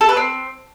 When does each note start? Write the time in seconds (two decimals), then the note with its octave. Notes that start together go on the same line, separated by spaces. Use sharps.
0.01 A4
0.09 B4
0.17 C4